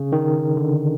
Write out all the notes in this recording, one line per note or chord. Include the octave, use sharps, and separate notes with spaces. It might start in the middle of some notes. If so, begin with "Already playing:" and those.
Already playing: C#3
D#3
D3